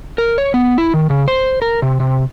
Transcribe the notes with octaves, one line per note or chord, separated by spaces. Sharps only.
A#4
C#5
B3
E4
D#3
C#3
C5
A#4
C3
C3